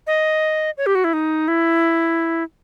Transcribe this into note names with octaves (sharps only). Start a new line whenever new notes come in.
D#5
C#5
G4
F#4
E4
D#4
E4